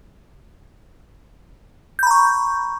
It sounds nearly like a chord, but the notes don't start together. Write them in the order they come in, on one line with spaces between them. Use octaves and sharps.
G6 B5 A#5 C#6